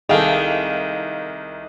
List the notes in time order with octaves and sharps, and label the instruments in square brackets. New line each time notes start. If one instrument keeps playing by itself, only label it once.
[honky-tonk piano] C2 D7 F7 [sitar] D#3 [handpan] G#4 A4 [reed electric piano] D#5 F5